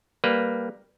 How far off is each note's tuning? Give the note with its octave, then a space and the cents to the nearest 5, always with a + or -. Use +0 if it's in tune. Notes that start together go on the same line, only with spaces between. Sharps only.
G3 +0 A#3 +0 B4 +0